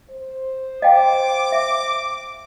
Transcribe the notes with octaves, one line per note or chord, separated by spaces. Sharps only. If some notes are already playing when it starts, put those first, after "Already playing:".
C5
D#5 F5 G5 D6
E5